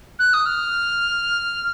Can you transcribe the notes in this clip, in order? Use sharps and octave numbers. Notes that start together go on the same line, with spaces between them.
F#6
D#6
F6